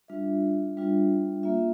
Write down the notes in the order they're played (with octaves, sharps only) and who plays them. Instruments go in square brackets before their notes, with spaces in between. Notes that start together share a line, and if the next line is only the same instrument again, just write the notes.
[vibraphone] G3 D4 F4 E5
G3 D4 F4
A#3 F4 E5